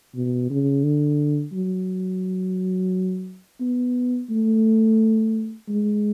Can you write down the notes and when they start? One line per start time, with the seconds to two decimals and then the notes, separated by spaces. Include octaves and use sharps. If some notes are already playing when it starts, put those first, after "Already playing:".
0.15 B2
0.50 C#3
0.84 D3
1.53 F#3
3.61 B3
4.30 A3
5.68 G#3